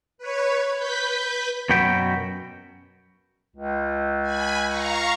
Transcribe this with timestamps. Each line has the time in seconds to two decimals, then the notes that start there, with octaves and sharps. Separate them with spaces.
0.18 B4 C#5
0.76 B4 G6 B6
1.69 F#2 B2 F#4 G5 B5
3.56 C#2
4.22 G#5 B5
4.65 F5 A#5 C#6